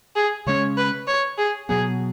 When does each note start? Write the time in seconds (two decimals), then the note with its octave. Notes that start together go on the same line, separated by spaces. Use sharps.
0.16 G#4
0.47 C#3 G#3 C#4 C#5
0.77 B4
1.07 C#5
1.38 G#4
1.69 B2 F#3 B3 G#4